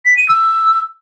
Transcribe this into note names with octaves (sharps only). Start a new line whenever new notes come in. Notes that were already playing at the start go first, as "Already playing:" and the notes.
B6
D#7
E6